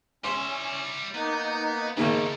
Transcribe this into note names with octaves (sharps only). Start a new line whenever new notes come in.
G3 C#4 E5 C6
A#3 B3 D#4
G#1 C#3 A3 A#3 D#4